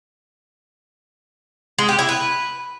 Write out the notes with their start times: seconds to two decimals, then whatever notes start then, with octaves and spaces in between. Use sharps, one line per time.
1.78 G#3
1.89 G4
1.99 E4
2.09 B4